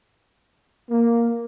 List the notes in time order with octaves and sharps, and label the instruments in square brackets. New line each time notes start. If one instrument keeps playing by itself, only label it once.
[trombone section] A#3